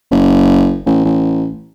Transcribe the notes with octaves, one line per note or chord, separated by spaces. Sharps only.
F#1
A1
A1